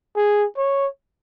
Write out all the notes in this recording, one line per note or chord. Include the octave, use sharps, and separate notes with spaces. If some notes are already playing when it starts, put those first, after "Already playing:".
G#4
C#5